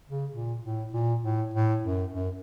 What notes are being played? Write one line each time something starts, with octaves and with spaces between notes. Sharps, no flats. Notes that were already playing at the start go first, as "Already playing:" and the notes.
C#3
A#2
A2
A#2
A2
A2
F#2
F#2